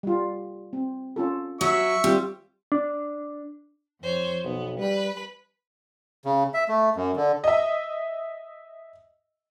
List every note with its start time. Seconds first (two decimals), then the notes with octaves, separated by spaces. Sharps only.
0.03 G3 F4
0.73 C4
1.16 C#4 F4 A4
1.61 F#3 E5 C#6
2.04 G3 C4 F4
2.72 D4
4.01 F2 C5 C#5
4.44 B1 B3
4.79 G3 B4 B5
6.25 C#3
6.54 E5
6.68 A3
6.96 F#2
7.16 D3
7.44 D#5 E5